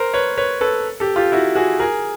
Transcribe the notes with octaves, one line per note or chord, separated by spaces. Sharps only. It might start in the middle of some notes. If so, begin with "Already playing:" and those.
Already playing: A#4 C5
B4 C#5
B4 C#5
A4 B4
G4 A4
F4 G4
E4 F#4
F#4 G#4
G#4 A#4